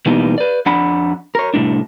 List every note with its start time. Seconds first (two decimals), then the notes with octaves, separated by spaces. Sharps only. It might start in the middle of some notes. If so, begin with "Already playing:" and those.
0.06 B2 E3 G3 A#3 B3 D#4
0.38 B4 D5
0.66 F2 D4 F#5 B5
1.35 A#4 C#5
1.54 C2 A2 D4